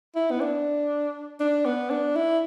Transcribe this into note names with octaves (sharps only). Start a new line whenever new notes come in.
E4
B3
D4
D4
B3
D4
E4